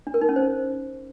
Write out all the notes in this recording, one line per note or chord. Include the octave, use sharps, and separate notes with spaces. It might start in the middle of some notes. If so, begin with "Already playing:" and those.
D4
A#4
D#4
C#4
C5